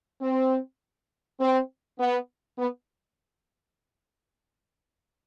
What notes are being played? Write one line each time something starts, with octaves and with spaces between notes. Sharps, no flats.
C4
C4
B3
B3